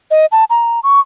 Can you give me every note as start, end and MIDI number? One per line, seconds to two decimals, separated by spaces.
0.11 0.26 75
0.32 0.44 81
0.50 0.80 82
0.83 1.00 85